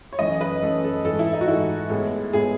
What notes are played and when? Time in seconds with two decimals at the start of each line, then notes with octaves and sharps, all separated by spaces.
0.13 C#5
0.19 F#2 E3 A3 C#4 D#5
0.41 B4
0.62 F#2 E3 A3 C#4 A4
0.84 A4
1.05 G#2 E3 A3 A4
1.19 E4
1.33 D#4
1.41 F#4
1.47 G#2 E3 A3 E4
1.90 A2 G#3 B3
2.33 A2 G#3 B3 G#4